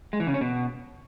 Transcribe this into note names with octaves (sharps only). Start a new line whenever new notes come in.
G#3
E3
C#3
C#4
B2